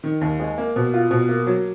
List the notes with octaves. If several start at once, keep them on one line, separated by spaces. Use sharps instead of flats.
D#3
D#2
G#3
A#3
B2
F4
B2
A#3
F#3